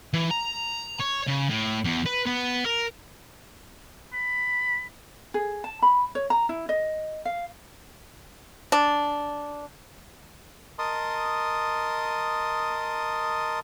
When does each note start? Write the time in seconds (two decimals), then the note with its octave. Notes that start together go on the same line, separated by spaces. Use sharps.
0.13 E3
0.31 A#5
1.00 C#5
1.28 C#3
1.50 A2
1.84 E2
2.06 B4
2.26 B3
2.66 A#4
4.13 B5
5.34 G#4
5.64 A5
5.82 B5
6.15 C#5
6.30 A#5
6.49 E4
6.69 D#5
7.25 F5
8.72 D4
10.79 A#4 D#5 A5 C6 D#6